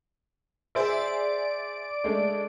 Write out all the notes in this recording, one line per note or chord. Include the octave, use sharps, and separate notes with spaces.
G#4 C5 D5 E5 D7
G#3 A3 D4